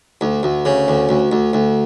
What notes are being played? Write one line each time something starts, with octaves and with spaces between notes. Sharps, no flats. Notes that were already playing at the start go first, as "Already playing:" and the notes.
D2
D2
C#3
D2
D2
D2
D2